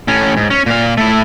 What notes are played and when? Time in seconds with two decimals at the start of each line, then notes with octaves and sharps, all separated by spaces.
0.08 A2 C#4
0.37 G#2
0.50 C#4
0.66 A#2 F5
0.97 A3 E4